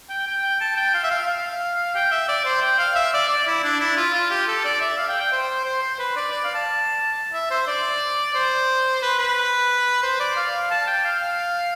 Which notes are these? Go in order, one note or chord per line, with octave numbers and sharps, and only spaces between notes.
G5
G5
A5
G5
F5
E5
F5
F5
G5
E5
D5
C5
G5
F5
E5
D5
D5
E4
D4
E4
F4
F4
G4
A4
D5
E5
F5
G5
G5
C5
C5
C5
B4
D5
D5
F5
A5
E5
C5
D5
C5
B4
B4
C5
D5
F5
A5
G5
F5